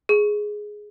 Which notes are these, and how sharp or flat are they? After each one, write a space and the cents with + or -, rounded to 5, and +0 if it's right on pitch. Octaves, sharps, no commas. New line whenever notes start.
G#4 +5